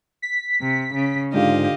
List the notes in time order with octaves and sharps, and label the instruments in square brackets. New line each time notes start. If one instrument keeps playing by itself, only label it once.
[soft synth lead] B6
[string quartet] C3
C#3
[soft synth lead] G#2 [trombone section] D3 D4 F4 [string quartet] G4 D#5 F5